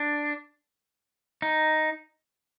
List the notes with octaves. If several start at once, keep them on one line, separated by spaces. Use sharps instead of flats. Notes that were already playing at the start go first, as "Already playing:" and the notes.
Already playing: D4
D#4